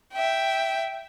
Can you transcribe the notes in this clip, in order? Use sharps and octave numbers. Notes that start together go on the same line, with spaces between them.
E5 G5